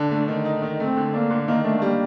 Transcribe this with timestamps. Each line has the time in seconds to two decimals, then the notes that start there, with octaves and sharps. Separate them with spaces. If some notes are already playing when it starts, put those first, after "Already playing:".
Already playing: D3 D4
0.11 A3
0.28 D#3
0.45 D#4
0.62 D#3
0.80 A3 C4
0.97 D3
1.13 A#3 D4
1.30 D3
1.48 D#3 A#3
1.65 A3 D4
1.78 A3
1.82 G3 A#3